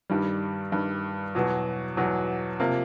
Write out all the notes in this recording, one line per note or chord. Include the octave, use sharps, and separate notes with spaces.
G2 D#3 G3
G2 D#3 G3
E2 B2 F#3
E2 B2 F#3
C3 F3 A#3